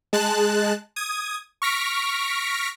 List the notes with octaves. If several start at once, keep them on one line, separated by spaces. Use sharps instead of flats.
G#3 A5 F#6
D#6 G#6
C#6 F6 A#6 B6 D7